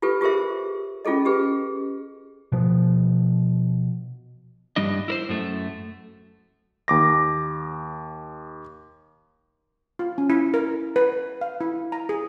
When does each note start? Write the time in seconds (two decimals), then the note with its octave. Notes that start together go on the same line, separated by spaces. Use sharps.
0.02 F4 G4 A4 B4
0.21 F4 G4 G#4 A#4 C5 E5
1.05 C#4 F4 G#4 A4 D#5
1.25 G4 G#4 B4
2.52 B2 F3
4.76 G2 G3 D4 D#5
5.08 E4 A#4 C5
5.29 F#2 A3
6.88 D#2 D6 A#6
9.99 F4
10.18 C#4
10.30 E4
10.54 A#4
10.96 B4
11.41 F5
11.61 E4
11.92 A#5
12.09 G#4